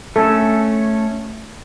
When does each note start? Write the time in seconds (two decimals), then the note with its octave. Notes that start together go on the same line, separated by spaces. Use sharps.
0.16 A3 C#4 A4